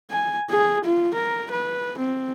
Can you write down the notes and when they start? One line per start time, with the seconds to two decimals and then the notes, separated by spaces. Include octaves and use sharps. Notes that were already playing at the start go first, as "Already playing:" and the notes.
0.11 G#5
0.50 G#4
0.85 F4
1.15 A#4
1.51 B4
1.99 C4